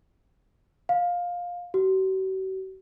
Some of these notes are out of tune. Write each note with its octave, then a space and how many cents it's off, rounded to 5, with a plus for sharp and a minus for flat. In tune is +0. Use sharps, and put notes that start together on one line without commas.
F5 +15
F#4 +45